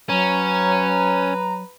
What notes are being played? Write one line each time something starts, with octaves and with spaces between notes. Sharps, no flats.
F#3 C#4 B4 A#5